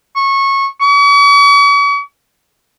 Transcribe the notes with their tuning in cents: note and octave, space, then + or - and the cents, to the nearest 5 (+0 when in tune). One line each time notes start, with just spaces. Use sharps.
C#6 -20
C#6 +45